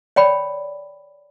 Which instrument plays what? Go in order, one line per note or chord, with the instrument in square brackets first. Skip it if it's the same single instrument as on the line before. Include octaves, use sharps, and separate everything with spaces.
[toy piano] C#5 D5 G5 B5